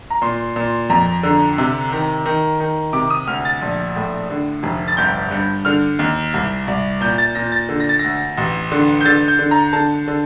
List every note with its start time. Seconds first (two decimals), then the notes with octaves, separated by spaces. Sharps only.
0.10 A#5
0.22 A#2 C6
0.56 A#2
0.90 F2 A#5
1.23 D3
1.58 C3
1.92 D#3
2.26 D#3
2.60 D#3
2.93 C3 D6
3.10 D#6
3.27 D2 F6
3.45 A6
3.62 A#1
3.96 A2
4.30 D3
4.63 F1
4.88 A6
4.97 G1 G6
5.31 G2
5.65 D3 F6
5.99 D#2
6.34 C2
6.67 C2
7.01 A#2 G6
7.18 A6
7.35 A#2 A#6
7.52 A6
7.69 D3
7.80 A#6
7.89 A6
7.99 D2 A#6
8.38 A1
8.72 D3
9.01 G6
9.05 D3 A6
9.28 G6
9.39 D3
9.51 A#5
9.73 D3 A5
10.07 D3